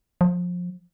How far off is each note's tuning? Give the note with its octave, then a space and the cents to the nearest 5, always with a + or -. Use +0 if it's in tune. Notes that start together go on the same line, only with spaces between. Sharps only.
F3 +25